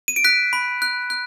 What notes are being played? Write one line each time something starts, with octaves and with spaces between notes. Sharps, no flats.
D#7
D7
F#6 B6
B5
F#6
F#6